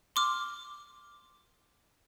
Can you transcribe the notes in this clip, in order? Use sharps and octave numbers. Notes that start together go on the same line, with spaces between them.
C6 D6 F6